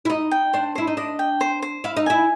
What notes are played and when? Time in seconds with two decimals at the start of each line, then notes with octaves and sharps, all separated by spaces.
0.05 E4
0.10 D#4 D#5
0.31 G5
0.53 D4 C5
0.75 E4 C5
0.87 D#4
0.97 D4 D#5
1.19 G5
1.41 C5
1.62 C5
1.84 E4 F5
1.97 D#4
2.06 E4 G#5